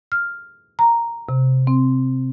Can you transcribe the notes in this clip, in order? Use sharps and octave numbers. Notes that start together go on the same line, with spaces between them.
F6
A#5
C3
C4